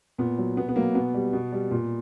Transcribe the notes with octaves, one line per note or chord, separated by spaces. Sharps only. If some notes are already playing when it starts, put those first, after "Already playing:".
A#2 B3
F#3
B2 B3
B3
F#3 A#3
B2 B3
G3
B2
G3
A#2